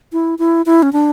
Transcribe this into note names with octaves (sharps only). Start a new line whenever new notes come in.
E4
E4
E4
C#4
D4